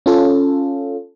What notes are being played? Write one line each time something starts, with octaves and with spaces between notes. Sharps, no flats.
C#4 F4 A4